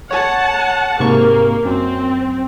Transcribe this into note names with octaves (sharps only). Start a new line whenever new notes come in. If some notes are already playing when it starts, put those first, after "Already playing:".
C#5 F#5 A5
G#2 C3 A#3 C#6
F#2 C4